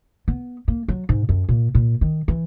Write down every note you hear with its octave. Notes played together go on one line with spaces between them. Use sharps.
B3
A#3
F#3
G#2
F#2
A#2
A#2
D#3
E3